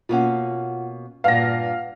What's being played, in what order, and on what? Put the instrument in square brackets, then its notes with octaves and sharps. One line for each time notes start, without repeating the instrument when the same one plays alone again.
[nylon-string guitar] B2 A#3 C#4 [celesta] F4 F#5
[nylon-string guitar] G2 A#2 [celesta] B4 F#5 [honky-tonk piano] F5 A#6